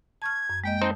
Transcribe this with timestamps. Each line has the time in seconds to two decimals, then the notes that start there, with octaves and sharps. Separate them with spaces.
0.22 A5 C#6 F6 G#6
0.49 F#2
0.64 G#3 A#3 D#5 G5
0.82 C4 D#4 C5 A5 D#6